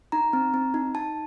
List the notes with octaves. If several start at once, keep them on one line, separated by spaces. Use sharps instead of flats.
D#4 A#5
C4
C4
D#4
D#4 A5